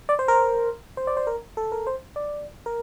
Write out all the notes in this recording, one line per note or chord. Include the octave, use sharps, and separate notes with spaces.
D5
C5
A#4
C5
D5
C5
A#4
A4
A#4
C5
D5
A#4